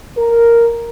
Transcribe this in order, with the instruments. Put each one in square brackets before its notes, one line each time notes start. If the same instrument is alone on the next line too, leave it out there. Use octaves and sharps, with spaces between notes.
[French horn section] A#4